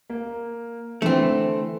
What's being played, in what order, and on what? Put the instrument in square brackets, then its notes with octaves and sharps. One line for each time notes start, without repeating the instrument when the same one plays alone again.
[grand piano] A#3
[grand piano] D3 E3 [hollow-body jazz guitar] A3 C4